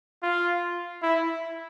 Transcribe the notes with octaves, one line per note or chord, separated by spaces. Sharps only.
F4
E4